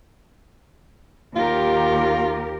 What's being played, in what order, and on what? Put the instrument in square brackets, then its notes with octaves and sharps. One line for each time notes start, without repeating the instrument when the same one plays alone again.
[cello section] D#2 G4 A#4 [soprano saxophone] F4